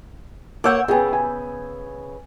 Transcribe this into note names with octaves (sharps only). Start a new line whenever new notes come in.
A#3 C#5 F#5 D6 E6 G6
C#3 B3 G#4 G5 G#5
G#5